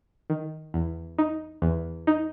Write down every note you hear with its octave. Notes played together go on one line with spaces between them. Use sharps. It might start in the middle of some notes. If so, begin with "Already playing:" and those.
D#3
E2
D#4
E2
D#4